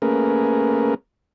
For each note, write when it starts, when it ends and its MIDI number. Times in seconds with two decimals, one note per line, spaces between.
0.02 0.94 57
0.02 0.94 58
0.02 0.94 61
0.02 0.94 68
0.02 0.94 70
0.02 0.94 71